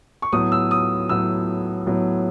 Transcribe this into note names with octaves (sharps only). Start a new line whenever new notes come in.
C#6
A2 F#3 B3 D#6
E6
D#6
A2 F#3 B3 E6
A2 F#3 B3